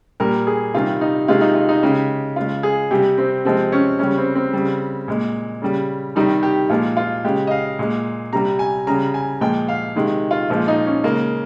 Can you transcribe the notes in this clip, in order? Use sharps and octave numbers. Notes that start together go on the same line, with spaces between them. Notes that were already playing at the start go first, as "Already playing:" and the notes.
A#2 G3 A#4
G#4
C3 D#3 G3 F4
D#4
C3 D#3 G#3 F4
D#4
F4
D#4
C#3 G#3 G4
C#3 G#3 F4
G#4
C3 G3 G4
C4
C3 F3 G#3 C4
C#4
C#3 G3 C#4
C4
C4
C#3 G3
A#2 G#3
C#3 G3
C3 D#3 G3 D#4
G4
A#2 F3 G#3 F4
F4
C#3 G#3 G4
D#5
F5
A#2 G#3
C3 G3 A#5
G#5
C#3 G3 A#5
G#5
A#2 F3 G#3 G5
F5
C3 D#3 G#3
F4
A#2 F3 G#3 F4
D#4
C#4
C#3 G#3 A#3